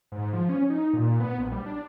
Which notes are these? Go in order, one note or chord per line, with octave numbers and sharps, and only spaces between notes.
G#2
F3
C#4
D#4
A#2
B3
A#1
G3
D4